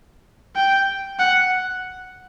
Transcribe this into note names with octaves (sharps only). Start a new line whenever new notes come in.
G5
F#5